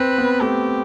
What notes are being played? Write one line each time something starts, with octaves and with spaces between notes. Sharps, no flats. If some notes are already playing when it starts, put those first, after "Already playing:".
Already playing: C4 B4
B3
A3 G4